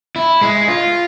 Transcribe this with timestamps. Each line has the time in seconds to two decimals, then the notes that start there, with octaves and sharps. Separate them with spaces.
0.16 E4
0.41 G#3
0.68 F4